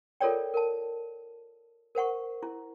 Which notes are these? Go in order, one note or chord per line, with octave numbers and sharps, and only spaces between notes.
F4 A4 A#4 C#5 D5 G5
A#4 A5
A#4 C5 F#5 C#6
E4